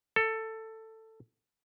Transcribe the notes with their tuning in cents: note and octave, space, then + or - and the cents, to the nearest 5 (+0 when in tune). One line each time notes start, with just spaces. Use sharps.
A4 +15